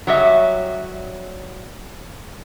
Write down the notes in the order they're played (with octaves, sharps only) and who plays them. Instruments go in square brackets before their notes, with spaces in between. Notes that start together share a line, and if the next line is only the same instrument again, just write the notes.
[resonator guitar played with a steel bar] F#3 G3 C#5 D#5 E5